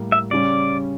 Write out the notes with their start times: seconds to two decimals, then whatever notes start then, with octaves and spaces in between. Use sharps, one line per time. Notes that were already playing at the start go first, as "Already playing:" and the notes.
Already playing: A2 G3 A#3
0.12 E5
0.31 C#3 G3 C#4 D5